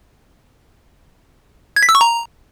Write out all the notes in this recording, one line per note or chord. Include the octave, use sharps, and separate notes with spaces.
G#6
B6
E6
C#6
A#5